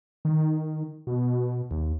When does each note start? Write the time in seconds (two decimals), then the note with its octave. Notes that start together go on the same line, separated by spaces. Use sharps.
0.25 D#3
1.07 B2
1.71 D#2